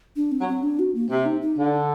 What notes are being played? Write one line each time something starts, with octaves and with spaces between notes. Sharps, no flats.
D4
C4
F#3
C4
D4
F#4
A#3
C3 C4
D#4
D#4
D3 D4